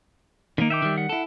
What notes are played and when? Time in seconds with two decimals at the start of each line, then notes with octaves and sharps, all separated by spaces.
0.58 D3 D#3 A#3 D#4
0.70 E5 G5 D6
0.82 D#3 G3
0.98 F#5
1.09 E4 A4